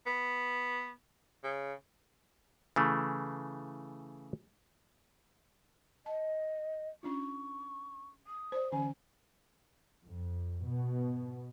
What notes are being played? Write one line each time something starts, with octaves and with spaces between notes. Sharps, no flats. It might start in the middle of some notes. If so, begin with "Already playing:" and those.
B3
C#3
C#3 E3 A3
D#5 A5
C#4 D4 F4 C#6
D#6
C5 D5
D3 E3 C#4 G#5
F2
B2